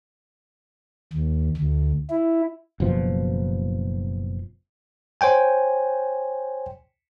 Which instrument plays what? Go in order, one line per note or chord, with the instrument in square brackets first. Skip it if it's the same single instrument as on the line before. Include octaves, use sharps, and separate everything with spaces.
[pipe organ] D#2
D2
E4
[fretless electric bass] F#1 B2 F3
[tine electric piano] C5 C#5 G5 G#5